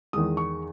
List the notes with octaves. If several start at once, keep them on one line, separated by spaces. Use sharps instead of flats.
E2 D#3 G#3 D#6
C#6